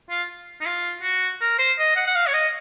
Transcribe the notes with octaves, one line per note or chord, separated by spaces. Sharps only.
F4
D#4
F4
F#4
A#4
C5
D#5
F#5
F#5
F5
C#5
D#5